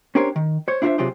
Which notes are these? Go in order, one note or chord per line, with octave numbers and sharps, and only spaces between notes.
C#4 D4 G4 A#4 C5 C#5
D#3
C5 C#5
D4 E4 F4 A4 C5 E5
C3 F#3 F4 G4 G#4 C5